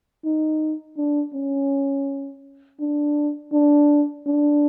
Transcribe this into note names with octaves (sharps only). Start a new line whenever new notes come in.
D#4
D4
C#4
D4
D4
D4